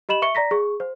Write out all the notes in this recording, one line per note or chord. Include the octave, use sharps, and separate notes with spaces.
G4 D#5 B5 E7 F#7
E5 C#6 C#7 G7
D5 A#5 A#6 B6
G#4 C#6
C5